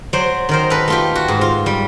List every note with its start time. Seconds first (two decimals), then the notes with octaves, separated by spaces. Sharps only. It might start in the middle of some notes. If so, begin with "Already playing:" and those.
0.13 F#3 C5 D5
0.49 D#3 A#4 C5
0.70 A4 B4
0.88 A3 F4 G4
1.15 F#4
1.28 G#2
1.41 F4
1.66 G3